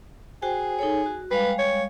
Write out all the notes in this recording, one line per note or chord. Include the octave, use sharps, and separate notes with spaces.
F#4 G#4 C5 G5
D#4 A4 C#5
F#4
G3 G#3 B4 F5
C#5